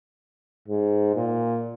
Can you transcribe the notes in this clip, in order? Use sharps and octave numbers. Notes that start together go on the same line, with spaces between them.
G#2
A#2